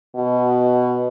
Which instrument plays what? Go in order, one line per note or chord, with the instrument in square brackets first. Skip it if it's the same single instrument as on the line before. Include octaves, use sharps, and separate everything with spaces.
[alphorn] B2